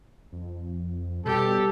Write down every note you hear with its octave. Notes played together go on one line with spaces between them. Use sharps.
F2
B2 G3 G4 A4